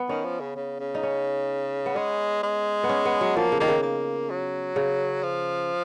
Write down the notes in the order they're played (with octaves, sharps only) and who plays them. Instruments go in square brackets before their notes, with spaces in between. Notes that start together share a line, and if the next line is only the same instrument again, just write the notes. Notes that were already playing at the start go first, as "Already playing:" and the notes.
Already playing: [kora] B3
[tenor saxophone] D#3 [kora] C#4
[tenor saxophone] F3
C#3
C#3
C#3
[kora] D#4
C#4
B3
[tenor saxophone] G#3 [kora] C#4
[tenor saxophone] G#3
[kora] B3
C#4
B3
F#3
[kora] F3 [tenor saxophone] A#3
[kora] C#3
[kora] D#3 [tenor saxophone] A#3
[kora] C#3
[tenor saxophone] A#3
F#3
[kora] C#3
[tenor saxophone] F3